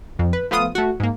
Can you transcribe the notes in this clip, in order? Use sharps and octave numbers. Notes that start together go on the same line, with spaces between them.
F2
B4
F3 A3 B3 F4 D#6
A3 F#4
G#2 A#3